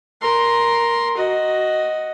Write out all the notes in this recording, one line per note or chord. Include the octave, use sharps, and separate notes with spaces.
A#4 C6
F#4 D#5